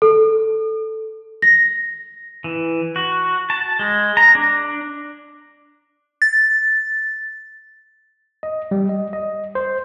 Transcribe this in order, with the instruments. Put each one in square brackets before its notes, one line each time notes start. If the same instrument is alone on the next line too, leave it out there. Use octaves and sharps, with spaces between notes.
[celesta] A4
A#6
[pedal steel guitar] E3
F#4
A5
G#3
A#5
D4
[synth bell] A6
[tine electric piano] D#5
G3
D#5
D#5
C5